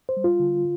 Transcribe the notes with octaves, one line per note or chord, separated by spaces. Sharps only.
C5
G3
F4
D3